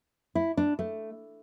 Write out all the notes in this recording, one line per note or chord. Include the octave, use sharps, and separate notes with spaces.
E4
D4
A3